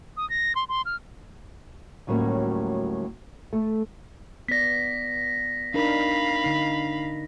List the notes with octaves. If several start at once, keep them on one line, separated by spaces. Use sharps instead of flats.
D#6
A#6
C6
C6
F6
D2 A2 F#3 G3 A#3 C#4
A3
B3 D5 A#6 B6
D4 D#4 A#4 F5 B5
D3 D#4